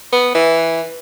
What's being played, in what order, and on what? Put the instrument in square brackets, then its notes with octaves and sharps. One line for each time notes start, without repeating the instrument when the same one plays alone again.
[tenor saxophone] B3
E3